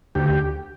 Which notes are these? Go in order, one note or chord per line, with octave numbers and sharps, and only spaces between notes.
D2 G4